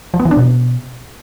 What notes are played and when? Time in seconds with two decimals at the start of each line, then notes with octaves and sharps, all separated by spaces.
0.14 F3
0.20 B3
0.25 E3
0.31 D4
0.37 B2